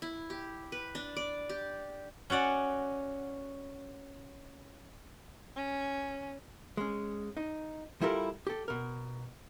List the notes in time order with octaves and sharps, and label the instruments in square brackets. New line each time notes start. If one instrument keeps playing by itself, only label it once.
[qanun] E4
G4
B4
D4
D5
G4
[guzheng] C#4 F#4 D5 F#5
[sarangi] C#4
[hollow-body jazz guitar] G#3 C#4
D#4
G3 E4 F4 A4 A#4
G4 A4
B2 A#4